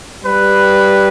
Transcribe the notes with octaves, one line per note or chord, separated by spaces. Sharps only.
G3 B4